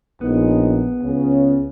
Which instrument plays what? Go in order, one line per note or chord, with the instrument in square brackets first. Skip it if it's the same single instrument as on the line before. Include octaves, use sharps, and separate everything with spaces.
[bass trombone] A#1 [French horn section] A2 G#3 D#4 [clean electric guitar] B3
[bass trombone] C#2 [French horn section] C#3